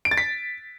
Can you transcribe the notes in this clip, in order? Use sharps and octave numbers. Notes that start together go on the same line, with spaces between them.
D7
A6
B6